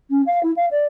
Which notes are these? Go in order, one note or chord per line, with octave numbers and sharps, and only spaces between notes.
C#4
F5
E4
F5
D5